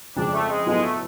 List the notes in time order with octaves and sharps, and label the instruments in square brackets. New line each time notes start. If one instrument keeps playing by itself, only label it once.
[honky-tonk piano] F2 C#3 F3 G#3 [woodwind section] D4
[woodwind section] A3
G#3
[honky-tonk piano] A2 F#3 B3 F4 A4 [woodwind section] G#3
[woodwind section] A3